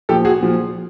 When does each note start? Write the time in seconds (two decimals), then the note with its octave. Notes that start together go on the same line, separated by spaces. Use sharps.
0.09 A#2 F3 G4 A4
0.25 F#4 G#4
0.41 A#2 F3